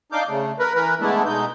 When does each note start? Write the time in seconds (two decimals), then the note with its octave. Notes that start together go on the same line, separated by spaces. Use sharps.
0.12 D4 D#4 F5 D6 G6
0.29 C#3 A3
0.59 A#4 B4
0.74 E3 A#4 B4
1.00 D3 G#3 A3 B3 D4 E4
1.26 B2 G#3 D#4 G6